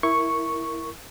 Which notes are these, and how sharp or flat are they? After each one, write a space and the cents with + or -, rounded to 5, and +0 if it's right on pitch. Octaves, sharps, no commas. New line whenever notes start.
E4 +0 A#4 +0 C#6 +0